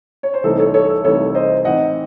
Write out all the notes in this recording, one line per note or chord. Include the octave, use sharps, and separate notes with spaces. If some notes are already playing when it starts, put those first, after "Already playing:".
C#5
C5
C2 C3 E3 A3 D#4 A4
A4 C#5
A4 C#5
A4
C2 C3 E3 A3 D#4 A4 C#5
C5 D#5
A2 E3 C4 D#4 D#5 F#5